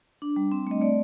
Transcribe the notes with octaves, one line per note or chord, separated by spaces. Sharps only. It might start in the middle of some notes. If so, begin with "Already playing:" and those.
D4
G3
C4
A3 D#5
A3 D5